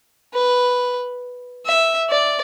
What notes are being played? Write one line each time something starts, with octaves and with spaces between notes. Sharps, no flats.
B4
E5
D5